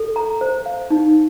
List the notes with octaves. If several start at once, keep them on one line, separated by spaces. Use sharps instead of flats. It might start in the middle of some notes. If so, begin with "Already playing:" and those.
Already playing: A4
A#5
C5
F5
D#4